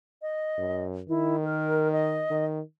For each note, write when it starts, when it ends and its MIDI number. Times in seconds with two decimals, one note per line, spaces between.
0.22 0.84 75
0.58 1.01 42
1.09 2.25 51
1.09 1.36 64
1.45 1.91 70
1.92 2.45 75
2.30 2.60 51